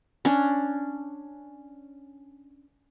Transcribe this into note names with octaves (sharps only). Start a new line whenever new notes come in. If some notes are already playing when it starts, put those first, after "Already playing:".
C#4 D4